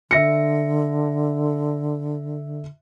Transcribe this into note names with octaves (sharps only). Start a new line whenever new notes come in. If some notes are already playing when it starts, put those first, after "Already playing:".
D3 E5 A#6 C#7